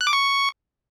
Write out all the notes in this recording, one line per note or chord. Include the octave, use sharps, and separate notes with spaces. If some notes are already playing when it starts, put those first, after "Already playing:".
F#6
D6
C#6